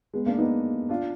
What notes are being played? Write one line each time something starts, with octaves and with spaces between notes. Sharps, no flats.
G#3 B3
A#3 D4
B3 D#4
D4 F4